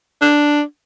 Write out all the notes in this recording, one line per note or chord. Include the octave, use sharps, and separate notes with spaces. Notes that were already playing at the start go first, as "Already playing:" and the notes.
D4